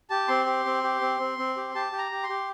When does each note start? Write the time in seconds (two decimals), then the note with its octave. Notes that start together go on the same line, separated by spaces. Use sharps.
0.10 G4 A5
0.28 C4 C6
0.46 G4
0.65 C4
0.83 G4
1.01 C4
1.19 C4
1.38 C4
1.56 G4
1.75 G4 A5
1.92 G4
1.98 A#5
2.11 G4
2.23 C6
2.29 G4